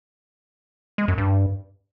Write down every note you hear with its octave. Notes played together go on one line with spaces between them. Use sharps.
G#3
F#2
G2